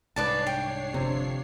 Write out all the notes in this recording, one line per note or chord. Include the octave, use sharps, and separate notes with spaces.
C2 G#2 D4 B4 C#5 D5 A5 C7
G5
G1 F2 C3